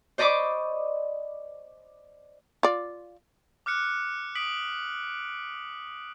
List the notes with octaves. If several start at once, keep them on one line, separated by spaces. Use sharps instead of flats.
C5 D5 D#5 B5 C#6 D6
F4 D5
D6 F6 F#6 C#7
D#6 B6 D7 F#7